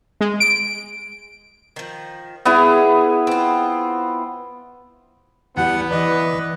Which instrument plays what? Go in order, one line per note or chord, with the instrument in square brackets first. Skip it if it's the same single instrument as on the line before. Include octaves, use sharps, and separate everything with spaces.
[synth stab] G#3
D7
[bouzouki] D#3 F3
[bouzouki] G#3 D4 G#4 [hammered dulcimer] B3 E4
[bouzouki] C4 F4
[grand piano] E2 G3 [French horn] B3 [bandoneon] F#5
[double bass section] E3 [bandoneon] B4 [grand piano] D5 D#5